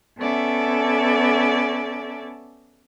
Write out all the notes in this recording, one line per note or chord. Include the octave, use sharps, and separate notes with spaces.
B3 C#4 A4 D5 E5